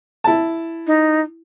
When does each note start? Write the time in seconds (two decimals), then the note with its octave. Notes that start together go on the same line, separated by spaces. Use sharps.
0.24 E4 A5
0.87 D#4